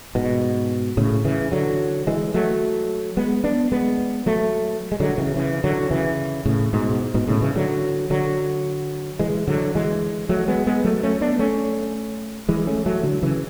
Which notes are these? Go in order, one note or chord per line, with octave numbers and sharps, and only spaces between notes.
G#2 B2
A2 C#3
C#3 E3
D3 F#3
E3 G#3
F#3 A3
G#3 B3
B3 D4
G#3 B3
F#3 A3
G#3
D3 F#3
C#3 E3
C#3 E3
D3 F#3
C#3 E3
A2 C#3
G#2 B2
G#2 B2
A2 C#3
C#3 E3
D3 F#3
D3 F#3
E3 G#3
D3 F#3
E3 G#3
F#3 A3
G#3 B3
G#3 B3
F#3 A3
A3 C#4
B3 D4
A3 C#4
E3 G#3
A3 C#4
F#3 A3
D3 F#3
C#3 E3